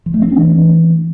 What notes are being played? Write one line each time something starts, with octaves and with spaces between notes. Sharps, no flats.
F3
A3
C4
D4
E3